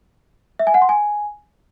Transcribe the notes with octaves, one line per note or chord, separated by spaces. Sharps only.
E5
G#5
F#5
C6
G#5